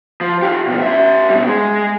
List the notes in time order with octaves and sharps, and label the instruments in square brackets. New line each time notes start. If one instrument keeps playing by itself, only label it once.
[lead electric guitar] F3
F4 G4
B2 F3
C#4 E5
B2 G3
G#3